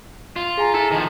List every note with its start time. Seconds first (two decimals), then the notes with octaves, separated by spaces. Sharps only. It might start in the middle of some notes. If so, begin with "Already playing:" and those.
0.36 F4
0.58 G#4 G#5 A#5
0.74 E4 A4 A5 B6
0.91 D#3 F3